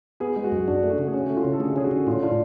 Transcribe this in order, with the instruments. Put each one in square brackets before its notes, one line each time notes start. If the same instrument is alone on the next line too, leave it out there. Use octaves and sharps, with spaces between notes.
[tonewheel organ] B3 [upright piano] G#4
[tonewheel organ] G#3
[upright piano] F#4
[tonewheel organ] F#2
[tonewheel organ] D4 [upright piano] F#4
[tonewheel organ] A3
[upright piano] F#4
[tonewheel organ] C#3
[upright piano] G#4
[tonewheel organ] C#4 [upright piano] F#4
[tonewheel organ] A3
[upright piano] F4
[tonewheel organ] C#3
[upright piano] A4
[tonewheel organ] D3 [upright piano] G#4
[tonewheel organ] C#4 [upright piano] G#4
[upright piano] F#4
[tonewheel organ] D3
[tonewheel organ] A2 [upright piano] F4
[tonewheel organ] D4 [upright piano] F4